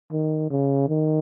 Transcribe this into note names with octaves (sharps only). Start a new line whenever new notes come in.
D#3
C#3
D#3